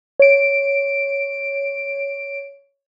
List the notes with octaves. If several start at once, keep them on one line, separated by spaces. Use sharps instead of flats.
C#5 D7